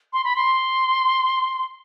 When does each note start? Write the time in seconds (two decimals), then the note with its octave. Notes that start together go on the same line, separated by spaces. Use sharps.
0.13 C6
0.24 B5
0.36 C6